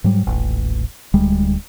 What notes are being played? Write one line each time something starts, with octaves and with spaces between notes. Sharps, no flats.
G#2 F#3 G3
D#1 A1
D1 D2 G3 G#3